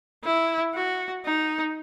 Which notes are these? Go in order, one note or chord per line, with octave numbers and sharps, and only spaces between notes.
E4
F#4
D#4